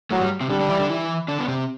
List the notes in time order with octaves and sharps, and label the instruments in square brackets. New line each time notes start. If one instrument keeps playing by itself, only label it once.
[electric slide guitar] A2 A3 [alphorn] F#3
[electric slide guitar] G2 G3
C3 C4
[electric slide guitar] D3 D4 [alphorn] G3
[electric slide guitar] D3 D4
E3 E4
D3 D4
E3 E4
D3 D4
B3
C3 C4